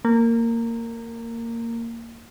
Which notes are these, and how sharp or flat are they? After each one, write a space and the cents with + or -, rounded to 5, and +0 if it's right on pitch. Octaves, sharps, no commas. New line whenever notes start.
A#3 -15